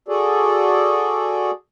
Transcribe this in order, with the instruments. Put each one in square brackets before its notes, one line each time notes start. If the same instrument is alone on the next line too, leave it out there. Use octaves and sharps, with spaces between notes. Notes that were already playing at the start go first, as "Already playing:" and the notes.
[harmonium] F#4 G#4 A4 D5